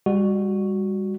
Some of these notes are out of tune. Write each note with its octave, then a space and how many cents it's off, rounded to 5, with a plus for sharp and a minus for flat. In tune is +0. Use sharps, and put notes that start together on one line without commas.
G3 +35 F#4 +0